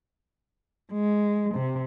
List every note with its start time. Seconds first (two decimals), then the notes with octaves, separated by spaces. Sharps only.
0.93 G#3
1.55 C3